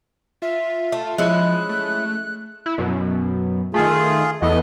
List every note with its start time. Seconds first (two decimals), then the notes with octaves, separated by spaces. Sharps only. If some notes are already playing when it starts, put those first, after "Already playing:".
0.42 F4 E5
0.92 A3
1.18 F3 G#3 C#4 E4 F#6
1.69 A3
2.66 E4
2.78 F#2 B2
3.74 D#3 A3 F4 G#4
4.42 E2 E3 A3 B3 D#5